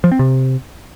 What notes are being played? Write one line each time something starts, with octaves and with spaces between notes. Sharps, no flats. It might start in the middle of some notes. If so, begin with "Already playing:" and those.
F3
C4
C3